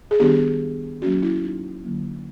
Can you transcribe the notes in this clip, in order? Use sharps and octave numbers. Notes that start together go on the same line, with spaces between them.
G#4
D#3 G3 B3 D4 G4
F#3 A#3 C#4 F#4
E4
D#4
D3 F#3 A#3